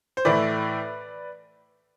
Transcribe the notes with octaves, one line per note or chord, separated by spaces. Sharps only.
C5
A2 E3 A3 E4 B4 D5